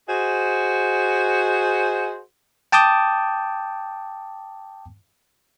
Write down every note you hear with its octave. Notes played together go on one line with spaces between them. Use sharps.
F#4 G#4 C5 D#5
G5 A5 D6 D#6 G6